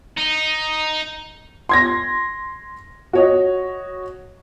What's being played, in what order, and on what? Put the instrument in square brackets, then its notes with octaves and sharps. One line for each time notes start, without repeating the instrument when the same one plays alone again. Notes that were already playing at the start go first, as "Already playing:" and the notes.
[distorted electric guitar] D#4
[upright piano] C6 G#6 A#6
F#4 C#5 D#5